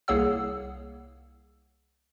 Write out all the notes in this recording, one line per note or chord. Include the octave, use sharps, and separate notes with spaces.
C2 A#3 G#4 C#5 F#5 E6